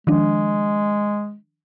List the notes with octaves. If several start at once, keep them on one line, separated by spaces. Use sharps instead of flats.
D#3 F3 G#3 D4